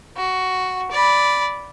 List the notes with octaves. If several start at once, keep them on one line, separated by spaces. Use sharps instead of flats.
F#4
D5 B5